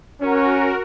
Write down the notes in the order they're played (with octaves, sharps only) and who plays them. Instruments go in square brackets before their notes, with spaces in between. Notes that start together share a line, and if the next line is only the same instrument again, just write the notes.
[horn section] C#4 [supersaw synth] F#4 A#4